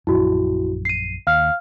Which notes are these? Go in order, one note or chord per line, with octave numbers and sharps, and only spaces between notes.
A#1 F#2 E4 F#4
C7 D#7
D#2 F5 F6